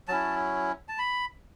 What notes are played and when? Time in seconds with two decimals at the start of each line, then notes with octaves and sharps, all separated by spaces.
0.08 F#3 C#4 E4 A5
0.88 A5
0.98 B5